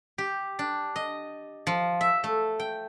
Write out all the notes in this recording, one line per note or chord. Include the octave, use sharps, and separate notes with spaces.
G4
D4
D#5
F3
E5
A3
G5